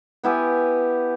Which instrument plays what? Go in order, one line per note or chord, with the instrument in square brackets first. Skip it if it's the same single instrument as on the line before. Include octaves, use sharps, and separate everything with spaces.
[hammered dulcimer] B3 E4 G4 G#5